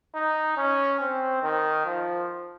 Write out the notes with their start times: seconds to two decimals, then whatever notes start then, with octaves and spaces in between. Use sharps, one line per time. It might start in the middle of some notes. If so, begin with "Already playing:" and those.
0.15 D#4
0.57 C#4
1.00 C4
1.43 D#3
1.86 F3